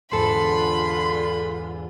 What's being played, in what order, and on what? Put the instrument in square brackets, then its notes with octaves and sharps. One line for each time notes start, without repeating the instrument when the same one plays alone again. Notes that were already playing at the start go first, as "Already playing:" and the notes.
[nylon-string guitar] E2 G#2 A4 [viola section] D3 F4 [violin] B5 [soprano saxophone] C6